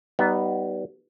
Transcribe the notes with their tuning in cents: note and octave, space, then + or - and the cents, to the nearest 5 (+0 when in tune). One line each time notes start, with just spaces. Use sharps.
G3 -25 B3 +0 D#4 +0